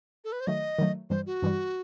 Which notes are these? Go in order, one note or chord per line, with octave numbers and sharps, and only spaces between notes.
A4
B4
C5
D#3 F#3 A3 D#5
D#3 F#3 A3
G2 E3 G3 C5
F#4
G2 E3 G3